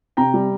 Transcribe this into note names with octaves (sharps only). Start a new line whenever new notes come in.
C3 G5 A#5
G3